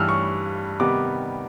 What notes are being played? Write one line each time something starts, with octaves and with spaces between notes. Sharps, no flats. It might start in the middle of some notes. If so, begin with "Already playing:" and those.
Already playing: G2 E3 G3 E6 F6
C#6
C3 D#3 G3 B3 D6